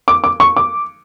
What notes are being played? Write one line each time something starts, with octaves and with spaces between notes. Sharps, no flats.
D6
D6
C#6
D6